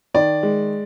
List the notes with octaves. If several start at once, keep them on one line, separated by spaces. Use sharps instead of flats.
D#3 D5
G#3